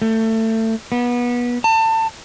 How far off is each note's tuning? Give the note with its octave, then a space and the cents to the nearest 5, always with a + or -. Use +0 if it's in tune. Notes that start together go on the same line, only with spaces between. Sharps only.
A3 +25
B3 -25
A5 +30